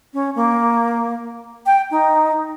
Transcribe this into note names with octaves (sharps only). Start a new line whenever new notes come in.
C#4
A#3
G5
D#4